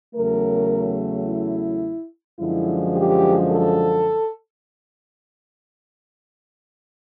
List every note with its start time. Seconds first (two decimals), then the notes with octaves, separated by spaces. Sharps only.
0.14 E2 C#3 F#3 A3 A#4
1.27 E4
2.39 F#2 D3 F3 G#3 E4
2.95 G4
3.51 A4